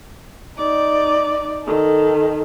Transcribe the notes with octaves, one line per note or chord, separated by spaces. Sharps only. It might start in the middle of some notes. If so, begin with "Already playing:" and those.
D#4 D5
D#3 A4